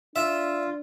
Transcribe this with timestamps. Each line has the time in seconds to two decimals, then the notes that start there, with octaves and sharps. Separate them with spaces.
0.16 D4 F4 E5